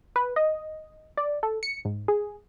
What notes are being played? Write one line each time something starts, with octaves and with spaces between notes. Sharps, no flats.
B4
D#5
D5
A4
C#7
G#2
G#4